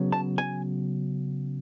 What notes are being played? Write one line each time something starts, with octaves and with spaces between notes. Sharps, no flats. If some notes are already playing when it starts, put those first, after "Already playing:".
Already playing: C#3 F#3 B3
A5
G#5